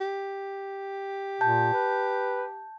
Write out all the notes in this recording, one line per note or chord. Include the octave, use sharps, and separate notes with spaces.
G4
A#2 A5 G6
B4